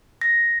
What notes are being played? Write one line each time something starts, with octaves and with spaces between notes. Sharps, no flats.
A#6